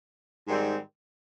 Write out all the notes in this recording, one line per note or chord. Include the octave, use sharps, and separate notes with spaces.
G#2 D#3 G3 C4